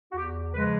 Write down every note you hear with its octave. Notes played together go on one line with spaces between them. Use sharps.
F#4
E2 G4
C#3 F3 G#3 B4